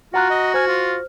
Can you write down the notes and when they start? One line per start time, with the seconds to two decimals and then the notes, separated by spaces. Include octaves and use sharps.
0.14 F4 F#4 F#5 A#5 F#6
0.30 D#5
0.54 C5 G#5 F6
0.68 F4